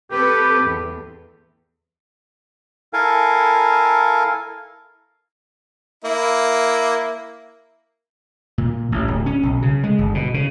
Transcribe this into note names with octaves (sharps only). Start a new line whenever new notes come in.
C4 G4 A4 B4
E2
E4 A4 A#4 F5 G#5
A#3 E4
A#2
A1
D1
C#4
B1
C#3
G#3
G1
B2
C#3